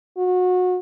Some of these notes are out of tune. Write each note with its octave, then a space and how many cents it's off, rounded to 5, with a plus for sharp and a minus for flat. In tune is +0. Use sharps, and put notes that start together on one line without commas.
F#4 -25